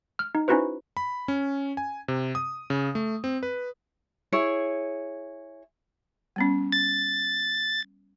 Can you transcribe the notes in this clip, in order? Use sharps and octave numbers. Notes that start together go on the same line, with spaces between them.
F6
D#4
C#4 D#4 E4 F#4 B4 C5
B5
C#4
G#5
C3
D#6
C#3
A3
C4
B4
E4 G#4 C#5
G3 B3 C#4
A6